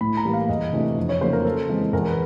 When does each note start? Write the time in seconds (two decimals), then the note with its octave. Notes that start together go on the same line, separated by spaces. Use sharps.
0.01 A2 B5
0.17 A#5
0.25 E3 G3 A#3
0.34 F5
0.49 E2 D#5
0.73 C3 E3 A3 D4
0.97 F2
1.09 C#5
1.21 C#3 F#3 A#3 D#4 C5
1.33 A#4
1.45 C#3 A4
1.69 E3 G#3 C4
1.93 E2 A#4
2.06 B4